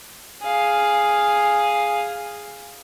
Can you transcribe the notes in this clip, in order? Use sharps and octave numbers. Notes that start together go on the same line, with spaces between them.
G#4 F5